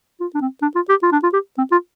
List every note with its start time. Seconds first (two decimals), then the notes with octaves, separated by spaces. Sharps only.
0.20 F4
0.34 D4
0.41 C4
0.62 D4
0.75 F4
0.89 G4
1.03 F4
1.12 D4
1.23 F4
1.33 G4
1.58 C4
1.72 F4